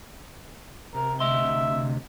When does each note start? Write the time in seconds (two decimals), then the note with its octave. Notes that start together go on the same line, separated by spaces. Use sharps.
0.94 C3 A#4
1.20 D2 D#5 E5 C6